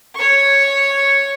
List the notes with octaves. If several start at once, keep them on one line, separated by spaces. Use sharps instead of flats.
C#5 C#6